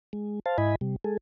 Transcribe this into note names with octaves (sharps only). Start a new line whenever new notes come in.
G#3
C5 F5 A5
G#2 E4 D#5 G#5 B5
C3 G3
G#3 G#4 A4